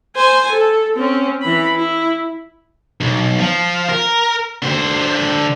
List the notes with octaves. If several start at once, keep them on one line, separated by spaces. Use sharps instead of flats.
C5 G#5
A4
C4 C#4
E3 B5
E4
B1
F3
A#4
D3 C5